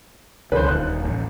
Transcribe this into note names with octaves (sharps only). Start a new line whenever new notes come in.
C#2 D3 E3 B4 C5
D#1 D#2 F#6
A1